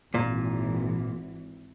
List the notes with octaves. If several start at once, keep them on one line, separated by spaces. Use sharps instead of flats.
G#1 A#2 E3